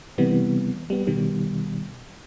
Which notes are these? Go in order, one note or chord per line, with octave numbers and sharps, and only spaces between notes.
C3 E3 G3 B3
G3 B3
B2 D#3 G3